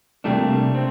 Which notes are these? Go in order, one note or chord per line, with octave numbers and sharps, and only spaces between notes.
C3 G3 A3 A#3 D4
C4